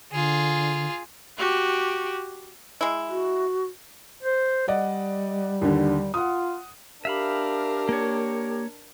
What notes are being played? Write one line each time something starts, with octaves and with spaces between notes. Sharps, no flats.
D3 F4 G#4
F#4 G4
G#3 E4
F#4
C5
G3 D5 D#5 F#5
D#2 D3
F4 F#5 D#6
D4 G4 A#4 E5 F5 B5
A#3 C#5